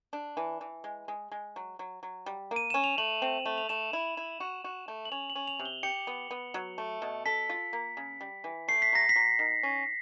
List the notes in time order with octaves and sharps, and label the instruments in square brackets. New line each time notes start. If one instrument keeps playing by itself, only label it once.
[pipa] D4
E3
E3
G#3
G#3
G#3
F#3
F#3
F#3
G3
A#3
[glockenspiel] D#7
[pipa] C#4 [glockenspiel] E7
[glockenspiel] F7
[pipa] A3 [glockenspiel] F#7
[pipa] C4
A3
[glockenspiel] F7
[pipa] A3 [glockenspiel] E7
[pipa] E4
E4
F#4
F#4
A3
[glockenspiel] F#7
[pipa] C#4 [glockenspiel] F7
[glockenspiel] F#7
[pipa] C#4
[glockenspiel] F7
[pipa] C3
[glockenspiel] G7
[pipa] G4 [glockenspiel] C#7
[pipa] B3
B3
F#3
A3
B2
[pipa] A4 [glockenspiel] B6
[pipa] F4
A#3
C#3
G3
E3
[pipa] A3 [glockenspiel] C7
[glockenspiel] B6
[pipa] F#3 [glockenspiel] A#6
[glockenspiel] B6
[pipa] F#3
D#3
C#4